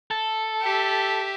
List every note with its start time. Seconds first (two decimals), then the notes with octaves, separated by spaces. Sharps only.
0.11 A4
0.62 G4 E5